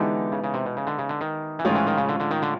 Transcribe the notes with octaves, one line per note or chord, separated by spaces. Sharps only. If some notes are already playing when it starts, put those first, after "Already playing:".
Already playing: D3 E3 G#3 B3 D#4 G4
C#3
C#3
C3
B2
C#3
D3
C#3
D3
D#3
E3
A2 D#3 F3 G#3 C#4 F4
E3
D#3
C#3
D3
D3
D#3
D3